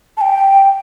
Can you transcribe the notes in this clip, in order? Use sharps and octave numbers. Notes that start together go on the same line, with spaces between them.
A5
G5